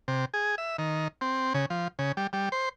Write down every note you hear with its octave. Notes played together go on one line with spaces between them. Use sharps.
C3
G#4
E5
D#3
C4
C#3
F3
C#3
G3
G3
C5